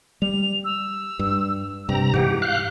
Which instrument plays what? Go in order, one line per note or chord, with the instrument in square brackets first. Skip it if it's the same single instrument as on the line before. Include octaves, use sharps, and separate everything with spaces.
[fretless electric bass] G3 [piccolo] F7
[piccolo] E6
[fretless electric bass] G2
[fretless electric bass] G2 [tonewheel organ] C3 A#5 [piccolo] G5
[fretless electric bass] G#2 E3 [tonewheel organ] G4 [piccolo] F#5
[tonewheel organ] F5 F#6 [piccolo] G6